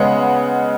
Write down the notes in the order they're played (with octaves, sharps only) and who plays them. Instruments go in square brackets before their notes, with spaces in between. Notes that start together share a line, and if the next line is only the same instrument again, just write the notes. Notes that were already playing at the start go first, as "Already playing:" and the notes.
Already playing: [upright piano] C#3 G#3 B3 D#5 F#5